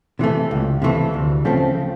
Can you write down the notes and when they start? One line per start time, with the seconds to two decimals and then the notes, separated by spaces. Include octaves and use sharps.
0.19 C3 E3 A3
0.51 C#2
0.82 C3 E3 A3
1.14 D2
1.45 C#3 F3 A3 C4